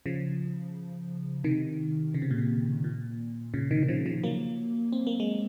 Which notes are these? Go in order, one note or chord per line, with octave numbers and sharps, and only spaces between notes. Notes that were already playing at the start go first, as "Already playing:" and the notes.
C#3 F3
C3 D#3
C#3
C3
A#2
C3
A#2
A#2 C#3
C3 D#3
D#3
C#3 F3
C#3 F3
F#3 A#3
C4
A#3
G#3